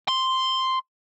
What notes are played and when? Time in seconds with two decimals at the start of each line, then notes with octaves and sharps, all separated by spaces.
0.08 C6